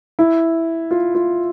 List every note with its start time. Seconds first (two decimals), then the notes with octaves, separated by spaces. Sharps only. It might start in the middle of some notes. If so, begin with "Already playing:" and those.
0.19 E4
0.91 F4
1.15 F4